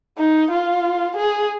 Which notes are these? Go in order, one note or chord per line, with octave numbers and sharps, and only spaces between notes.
D#4
F4
G#4